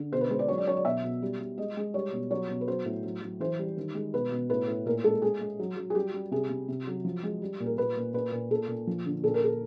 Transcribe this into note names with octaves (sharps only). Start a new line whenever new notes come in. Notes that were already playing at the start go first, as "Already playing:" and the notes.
Already playing: D3
B2 C5
B4
G#3 C5
D5
F#3 C#5
D5
F#3 C#5
D5
B2 E5
B2
G3
G3
G#3 D#5
G#3
G3 C#5
B2
F#3 C#5
B2
B4
F#3 C5
A2
F#3
F#3
E3 C5
G3
D#3
G#3
B2 B4
B2
A2 B4
A2
A#2 A#4
G#3 A4
G#3 G#4
G#3
F#3
F#3
G#4
G3 G4
G3
C3 G#4
C3
C3
F#3
F3
G#3
G3
A#2
A#4
A#2 B4
A#2
A#2 B4
A#2
A#2 A4
A#2
F3
D3
A#2 A4
A#4
A#2 A4